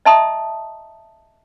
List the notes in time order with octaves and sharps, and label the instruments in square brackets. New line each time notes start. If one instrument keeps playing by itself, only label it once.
[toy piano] D#5 E5 A5 A#5 C6 D#6